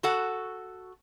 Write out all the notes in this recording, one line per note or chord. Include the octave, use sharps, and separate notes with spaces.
F#4 A4 F#5